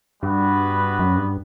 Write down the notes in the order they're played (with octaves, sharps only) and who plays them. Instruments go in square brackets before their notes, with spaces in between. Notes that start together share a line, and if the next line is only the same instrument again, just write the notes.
[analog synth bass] G2 [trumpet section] G3 B3 F#4 B4
[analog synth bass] F#2
G2